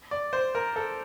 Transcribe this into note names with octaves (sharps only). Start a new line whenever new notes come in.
D5
C5
A#4
A4